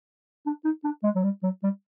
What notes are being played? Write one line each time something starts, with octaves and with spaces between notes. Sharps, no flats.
D4
D#4
D4
G#3
F#3
G3
F#3
G3